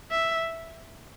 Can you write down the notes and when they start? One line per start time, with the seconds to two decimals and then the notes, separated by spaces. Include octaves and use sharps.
0.11 E5